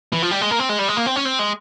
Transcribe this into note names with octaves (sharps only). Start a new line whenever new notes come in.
E3
F3
G3
G#3
A#3
C4
G#3
G3
G#3
A#3
C4
C#4
C4
G#3